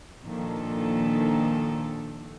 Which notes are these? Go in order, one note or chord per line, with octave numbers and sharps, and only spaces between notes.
A#2 D#3 F3 D4 A4